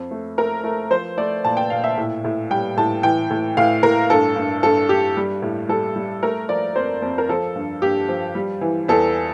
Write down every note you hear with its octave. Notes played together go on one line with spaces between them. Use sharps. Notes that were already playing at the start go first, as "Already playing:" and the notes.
Already playing: F2
A3
A3 A#4
A3
F3 C5
A3 D5
A#2 A5
G5
A#2 F5
E5
A2
A2
G3 G5
A2 A5
E3 G5
A2
A2 F5
A2 A#4
G2 A4
G2
G2 A4
G2 G4
G3
A2
G3 A4
G3
A3 A#4
F3 D5
F2 C5
F2
A#4
F3 A4
G2
G2 G4
F3
G3
E3
E2 A4